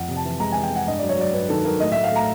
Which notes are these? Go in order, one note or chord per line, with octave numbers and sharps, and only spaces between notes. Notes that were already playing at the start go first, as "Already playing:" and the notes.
Already playing: F2 F#5
C3
A5
E3
G#3 A#5
G#5
E3
G5
G#3
F#5
G2 D#5
F#3 D5
C#5
F#3 D5
G2 B4
D#3 A4
F#3 A#4
A2 D#5
E5
A2
F5
A3 A#5